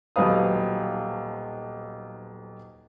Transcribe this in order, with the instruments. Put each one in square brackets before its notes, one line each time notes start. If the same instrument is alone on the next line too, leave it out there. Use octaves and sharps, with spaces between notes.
[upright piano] D#1 B1 C4 B4 F5 D#6